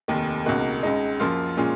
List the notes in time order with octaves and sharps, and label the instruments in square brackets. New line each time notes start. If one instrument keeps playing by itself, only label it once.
[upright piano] F1 D#2 D#3
C#2 B2 A#3 D#4 F#4
C#2 C#3 G#3 D#4
F#2 F3 A#3 F4
A#2 G#3 C#4 F4